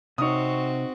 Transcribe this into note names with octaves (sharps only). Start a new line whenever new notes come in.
C3 C4 D#4 F#4 C#5 D#6